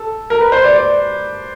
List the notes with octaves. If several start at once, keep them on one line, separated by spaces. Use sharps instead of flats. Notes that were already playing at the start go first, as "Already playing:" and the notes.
Already playing: A4
A#4
B4
C5
D5
D5